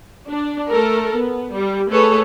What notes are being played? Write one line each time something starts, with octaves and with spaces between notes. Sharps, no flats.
D4
A3 A4 A#4
B3
G3
A3 G#4 A4 B4 C#5